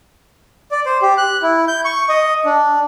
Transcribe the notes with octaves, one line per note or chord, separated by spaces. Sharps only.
D5
C5
G4
F#6
E4
G6
C#6
D#5
D4